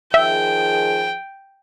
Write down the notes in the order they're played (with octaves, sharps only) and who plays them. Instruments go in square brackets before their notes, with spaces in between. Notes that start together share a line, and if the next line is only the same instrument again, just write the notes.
[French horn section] D#3 F3 G#4 [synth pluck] E5 [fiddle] G5